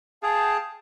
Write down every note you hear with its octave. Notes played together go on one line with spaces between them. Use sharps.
G#4 F5 G5 A5